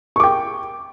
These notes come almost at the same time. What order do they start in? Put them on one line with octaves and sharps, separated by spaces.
C#6 D6 G5